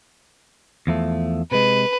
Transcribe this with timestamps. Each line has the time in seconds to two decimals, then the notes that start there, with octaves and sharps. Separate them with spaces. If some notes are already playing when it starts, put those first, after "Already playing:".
0.87 E2 F3 A3
1.52 C3 G#3 B4